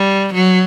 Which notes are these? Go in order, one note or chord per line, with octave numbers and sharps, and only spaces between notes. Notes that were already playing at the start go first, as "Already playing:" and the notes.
Already playing: G3
F#3